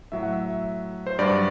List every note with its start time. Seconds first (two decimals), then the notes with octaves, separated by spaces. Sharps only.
0.12 A2 F#3 E5
0.23 F#5
0.33 E5
1.07 C5
1.19 G2 F#3 D5